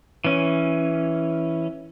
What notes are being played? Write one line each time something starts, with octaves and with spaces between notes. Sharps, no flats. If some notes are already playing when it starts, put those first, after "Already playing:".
E3 C#4